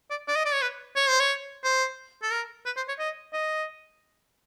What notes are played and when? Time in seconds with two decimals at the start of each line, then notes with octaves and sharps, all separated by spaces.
0.10 D5
0.28 D5
0.36 D#5
0.45 D5
0.53 C#5
0.62 B4
0.96 C#5
1.07 C5
1.20 C#5
1.64 C5
2.23 A4
2.31 A#4
2.66 B4
2.77 C5
2.88 C#5
2.99 D#5
3.33 D#5